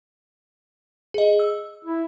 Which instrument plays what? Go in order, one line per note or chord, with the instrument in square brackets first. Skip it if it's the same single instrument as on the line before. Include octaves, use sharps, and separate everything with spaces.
[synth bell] G#4 D#5
E6
[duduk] E4